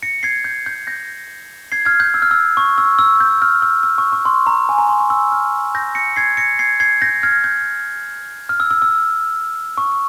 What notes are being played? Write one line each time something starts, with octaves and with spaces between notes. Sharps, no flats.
A#6 C#7
G#6 C7
G6
G6
G6 A#6
G#6 C7
F6 G#6
G6
E6
F6
E6
C#6
E6
E6
G6
F6
E6
E6
C#6
C#6
C6
A#5
G#5
A#5
C6
C#6
E6
F6
G6 A#6
A#6 C#7
G#6 C7
A#6 C#7
G#6 C7
G#6 C7
G6 A#6
F6 G#6
G6
F6
E6
E6
E6
C#6